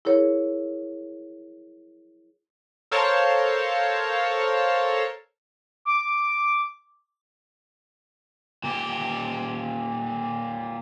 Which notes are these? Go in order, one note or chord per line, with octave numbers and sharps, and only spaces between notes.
E4 G#4 A#4 C#5
A4 A#4 C5 C#5 F5 A5
D6
A#2 G4